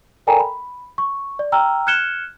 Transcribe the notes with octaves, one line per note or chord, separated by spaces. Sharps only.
A4 A#4 D5 G5 G#5 A#5
B5
C#6
D5
G5 A#5 E6 F6
F6 F#6 G#6 C#7 E7 G7